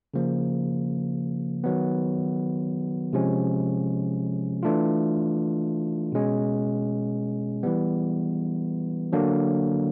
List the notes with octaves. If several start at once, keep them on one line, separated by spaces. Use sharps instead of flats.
C#3 F3 A#3
D#3 F#3 B3
C3 F3 G#3 C#4
E3 A3 D4 F4
B2 G#3 C#4
E3 G3 B3
D3 F#3 A#3 D4